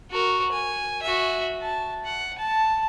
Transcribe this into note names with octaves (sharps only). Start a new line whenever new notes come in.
F#4 A#4
G#5
F#4 E5
A5
F#5
A5